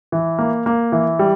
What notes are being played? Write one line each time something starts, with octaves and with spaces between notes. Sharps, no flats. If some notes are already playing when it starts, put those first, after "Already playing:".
E3
A#3
A#3
E3
G3